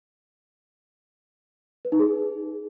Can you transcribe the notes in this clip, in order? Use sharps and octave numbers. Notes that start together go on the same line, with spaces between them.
B4
D#4
G#4